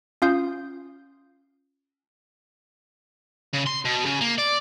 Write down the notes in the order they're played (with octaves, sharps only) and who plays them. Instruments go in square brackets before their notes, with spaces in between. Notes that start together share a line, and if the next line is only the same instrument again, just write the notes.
[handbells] C#4 F4 F5 D#6 G6
[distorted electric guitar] C#3
C6
B2
C#3
A#3
D5